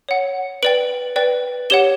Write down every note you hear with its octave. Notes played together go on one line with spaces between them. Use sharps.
C#5 F#5
B4 D5 G5 D7 F#7
B4 D5 G5
G4 C#5 F#5 E7 G7